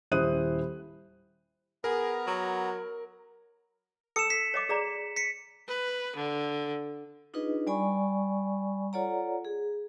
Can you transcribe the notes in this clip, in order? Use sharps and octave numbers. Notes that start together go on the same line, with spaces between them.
D#1 E4 C5 D#6 F#6 D#7
B3 G#4 A#4 B4 A#5
F#3
A4 A5 E6 C#7 E7
B6
C#5 D#5 D6
G#4 D5 A#5
B6 C#7
B4
D3
D4 D#4 F4 G#4 B4 D#5
G3 D5 G#5 B5 C#6
F4 A4 C#5 D5 F#5 A#5
G#4